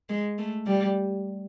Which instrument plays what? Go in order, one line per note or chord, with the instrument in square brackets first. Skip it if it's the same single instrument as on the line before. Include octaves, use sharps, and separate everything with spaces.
[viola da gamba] G#3
A3
G3